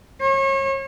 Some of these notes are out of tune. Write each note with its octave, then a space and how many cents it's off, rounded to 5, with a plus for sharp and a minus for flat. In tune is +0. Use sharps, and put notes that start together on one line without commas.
C#5 -35